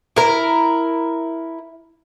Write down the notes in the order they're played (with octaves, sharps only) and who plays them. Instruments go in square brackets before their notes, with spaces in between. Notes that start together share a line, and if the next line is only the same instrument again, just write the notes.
[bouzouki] E4 A#4